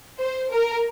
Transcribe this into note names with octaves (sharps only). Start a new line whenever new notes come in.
C5
A#4